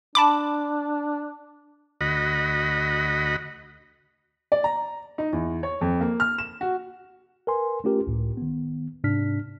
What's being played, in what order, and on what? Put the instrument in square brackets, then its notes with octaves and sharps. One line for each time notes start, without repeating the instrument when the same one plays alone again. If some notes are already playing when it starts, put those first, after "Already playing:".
[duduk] D4 [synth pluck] A5 B5 D6
[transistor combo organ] D2 F#4 D#5 B5
[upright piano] D5
A#5
D#4
E2
C#5
F2
A#3
F6
E7
F#4
[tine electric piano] A#4 B4 G#5 C6
A3 C#4 F4 G4 A#4
C#2 A2
D#3 B3
G#2 C3 D4 F6 B6